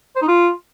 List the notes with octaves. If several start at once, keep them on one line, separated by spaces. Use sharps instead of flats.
C5
D#4
F4